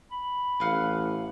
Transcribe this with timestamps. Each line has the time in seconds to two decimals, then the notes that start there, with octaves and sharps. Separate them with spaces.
0.11 B5
0.60 A1 B4 F5 F#5